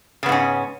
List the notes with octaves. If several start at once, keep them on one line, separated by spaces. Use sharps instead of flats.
G#2 C#3 B3 C#4